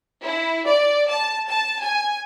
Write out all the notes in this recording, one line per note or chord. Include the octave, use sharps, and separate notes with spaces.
E4
D5
A5
A5
G#5